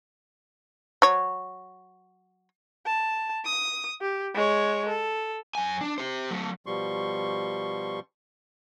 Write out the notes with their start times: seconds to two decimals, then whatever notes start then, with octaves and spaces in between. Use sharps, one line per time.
1.02 F#3 C#5
2.86 A5
3.45 D#6
4.01 G4
4.35 G#3 C#5
4.89 A4
5.55 F#2 G#5
5.81 D4
5.98 G4 C5
6.31 F#3 A3
6.66 B2 F3 G3 C6 C#6